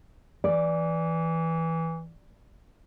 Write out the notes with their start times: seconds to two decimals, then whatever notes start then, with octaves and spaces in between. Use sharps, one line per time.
0.44 E3 D5